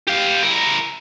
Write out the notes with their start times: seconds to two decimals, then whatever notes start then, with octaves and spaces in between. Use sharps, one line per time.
0.08 G4 F5
0.43 E4 A#4